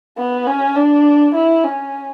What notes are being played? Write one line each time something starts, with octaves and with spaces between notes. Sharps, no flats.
B3
C#4
D4
E4
C#4